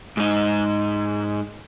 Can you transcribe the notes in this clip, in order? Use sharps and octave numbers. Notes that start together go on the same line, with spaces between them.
G#2 D#4